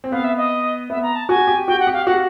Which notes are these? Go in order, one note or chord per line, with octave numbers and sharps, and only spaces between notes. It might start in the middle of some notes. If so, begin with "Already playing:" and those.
C4
B3 F5
E5
D#5
B3 E5
A#5
A5
F#4 G#5
G4
F#4 G5
F#5
G4
F5
F#4 F#5